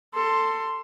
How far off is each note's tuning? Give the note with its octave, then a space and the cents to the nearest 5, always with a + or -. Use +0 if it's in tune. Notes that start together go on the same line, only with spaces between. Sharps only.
A4 +20 C6 +0